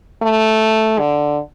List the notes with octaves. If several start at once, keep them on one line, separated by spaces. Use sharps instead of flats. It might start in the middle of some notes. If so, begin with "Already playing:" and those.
A3
D3